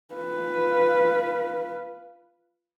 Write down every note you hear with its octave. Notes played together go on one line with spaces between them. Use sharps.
F4 B4